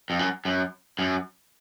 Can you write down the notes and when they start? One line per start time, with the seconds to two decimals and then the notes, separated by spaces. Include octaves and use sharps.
0.10 F2
0.19 F#2
0.45 F#2
0.99 F#2